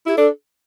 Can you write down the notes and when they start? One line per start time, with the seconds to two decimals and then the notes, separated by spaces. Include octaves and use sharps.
0.07 E4 G4
0.16 D4 A4